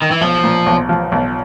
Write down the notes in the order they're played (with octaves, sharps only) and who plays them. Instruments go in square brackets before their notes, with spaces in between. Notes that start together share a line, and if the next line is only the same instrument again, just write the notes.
[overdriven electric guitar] D#3
E3
[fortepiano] B1 [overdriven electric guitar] F3
[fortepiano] A#2
B1
F3
B1